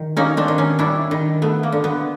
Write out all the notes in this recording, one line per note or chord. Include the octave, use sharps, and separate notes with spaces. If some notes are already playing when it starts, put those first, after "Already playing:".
Already playing: D#3
A#3 C#4 D#4
C4 D4
D#3
C#4 D#4
G3 D4 E4
D#3
A3 B3
A#3
D3
B3